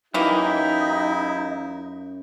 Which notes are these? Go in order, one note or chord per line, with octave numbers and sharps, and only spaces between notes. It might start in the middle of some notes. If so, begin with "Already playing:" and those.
F#2 E3 A#3 D#4 E4 G4